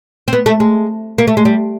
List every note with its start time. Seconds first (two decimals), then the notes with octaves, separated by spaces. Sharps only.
0.28 C4
0.33 B3
0.46 A3
0.60 G#3
1.18 A#3
1.27 A3
1.37 G#3
1.45 G3